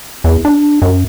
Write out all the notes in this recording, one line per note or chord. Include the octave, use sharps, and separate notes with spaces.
E2
D4
F#2